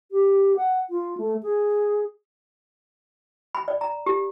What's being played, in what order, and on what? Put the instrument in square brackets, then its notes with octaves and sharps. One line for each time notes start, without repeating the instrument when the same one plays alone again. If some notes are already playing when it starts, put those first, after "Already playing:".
[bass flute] G4
F#5
F4
A3
G#4
[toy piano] B5
D5
A#5
G4